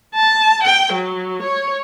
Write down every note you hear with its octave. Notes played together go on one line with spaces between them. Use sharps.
A5
G5
F#3
C#5